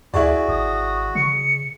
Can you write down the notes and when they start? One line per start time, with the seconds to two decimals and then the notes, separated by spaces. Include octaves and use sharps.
0.14 D2 E4 F#4 G#4 D5
0.48 G#1 D#6
1.15 C#3 C#7